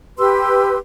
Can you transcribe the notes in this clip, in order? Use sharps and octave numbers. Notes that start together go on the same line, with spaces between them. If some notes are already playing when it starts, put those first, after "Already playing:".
G4 B4 C6 E6